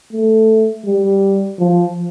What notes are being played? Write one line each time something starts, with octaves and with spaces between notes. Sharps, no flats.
A3
G3
F3